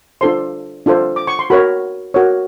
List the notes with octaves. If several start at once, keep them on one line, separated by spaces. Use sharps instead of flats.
D4 F4 A4 C5 C6
D4 F4 A4 C5
D6
C#6
C6
F#4 A#4 C#5 B5
F#4 A#4 C#5